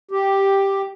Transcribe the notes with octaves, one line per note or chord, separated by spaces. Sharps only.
G4